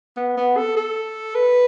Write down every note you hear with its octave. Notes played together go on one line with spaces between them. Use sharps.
B3
B3
A4
A4
B4